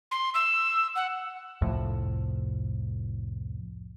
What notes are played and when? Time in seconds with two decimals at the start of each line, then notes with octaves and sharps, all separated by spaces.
0.11 C6
0.34 E6
0.96 F#5
1.62 C2 F2 A2